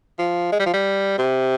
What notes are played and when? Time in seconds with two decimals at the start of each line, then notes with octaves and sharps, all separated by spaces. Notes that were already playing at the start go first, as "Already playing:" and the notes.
0.19 F3
0.52 G#3
0.59 G3
0.66 F3
0.74 G3
1.19 C3